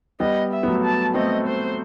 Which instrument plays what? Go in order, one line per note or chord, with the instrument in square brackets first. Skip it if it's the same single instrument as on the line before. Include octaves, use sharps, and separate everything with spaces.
[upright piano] G3 B3 [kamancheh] D#5
[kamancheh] E5
[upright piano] B3
F#3 A3
[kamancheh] A5
[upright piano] A3 C4 [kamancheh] D#5
[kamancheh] C5